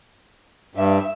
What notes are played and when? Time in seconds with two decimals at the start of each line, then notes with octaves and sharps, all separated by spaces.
0.75 G2 E5